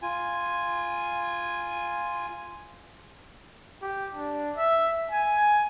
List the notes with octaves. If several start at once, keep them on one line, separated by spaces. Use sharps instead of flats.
F4 G#5
G4
D4
E5
G#5